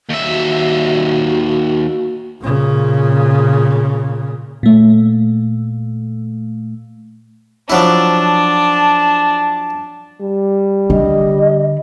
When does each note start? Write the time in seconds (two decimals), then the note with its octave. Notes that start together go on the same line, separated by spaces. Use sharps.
0.09 D#2 E5
0.25 F#4
2.41 A#2 C#3
4.63 A#2 A3
7.70 F3 F#3 D4 E4 A5
10.21 G3
10.90 D3 D#5